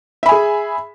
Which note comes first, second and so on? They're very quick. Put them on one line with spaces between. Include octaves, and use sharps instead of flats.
E5 B5 G#5 G#4